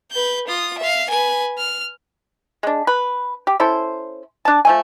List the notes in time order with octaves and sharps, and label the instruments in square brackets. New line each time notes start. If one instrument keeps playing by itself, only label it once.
[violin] B4 G6
F4 D#6
E5 F5
B4 G#5
F6
[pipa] G#3 D4
B4
G4
C#4 E4 A4 C5
D4 A5
F3 A3 G#5